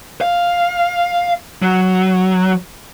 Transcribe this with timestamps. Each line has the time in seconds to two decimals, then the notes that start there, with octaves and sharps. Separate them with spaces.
0.21 F5
1.62 F#3